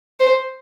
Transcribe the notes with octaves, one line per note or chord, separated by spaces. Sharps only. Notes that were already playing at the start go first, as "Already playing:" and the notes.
C5